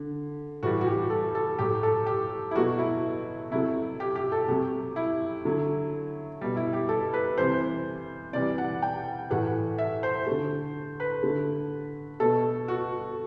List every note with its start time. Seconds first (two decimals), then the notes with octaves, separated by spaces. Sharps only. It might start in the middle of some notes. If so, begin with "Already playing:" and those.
Already playing: D3
0.63 A2 E3 G3 F#4
0.81 F#4
0.87 G4
1.10 A4
1.35 A4
1.59 A2 F#3 A3 G4
1.83 A4
2.06 G4
2.51 E4
2.56 B2 F#3 A3 F#4
2.79 E4
3.51 C3 F#3 A3 E4
4.00 G4
4.16 G4
4.32 A4
4.48 C3 F#3 A3 G4
4.96 E4
5.45 D3 F#3 A3
6.41 B2 G3
6.57 E4
6.73 G4
6.89 A4
7.14 B4
7.37 C3 E3 G3 C5
8.33 C3 E3 G3 D5
8.58 F#5
8.82 G5
9.31 A2 E3 A3 F#5
9.78 E5
10.03 C5
10.27 D3 A3
11.00 B4
11.23 D3 A3
12.20 B2 A3 A4
12.68 F#4